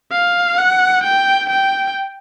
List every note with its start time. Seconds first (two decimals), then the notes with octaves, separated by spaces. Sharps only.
0.12 F5
0.58 F#5
1.04 G5
1.49 G5